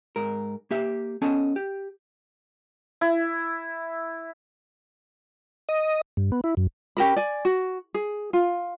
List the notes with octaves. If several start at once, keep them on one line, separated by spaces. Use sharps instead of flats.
G#2 A#4
A#3 G4 E5
B3 C#4 A4 D#5 A5
G4
E4
D#5
G2
B3
E4
F#2
C#4 G4 A#4 B5
D5 G#5
F#4
G#4
F4